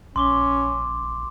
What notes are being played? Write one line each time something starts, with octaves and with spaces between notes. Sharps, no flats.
A#1 C#4 C6 D6 G7